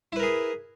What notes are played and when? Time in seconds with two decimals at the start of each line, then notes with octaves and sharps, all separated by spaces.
0.12 E4
0.16 B4
0.19 A#4
0.23 G#4